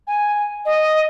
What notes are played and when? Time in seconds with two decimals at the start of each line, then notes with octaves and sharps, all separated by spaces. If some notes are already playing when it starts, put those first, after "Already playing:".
0.07 G#5
0.65 D#5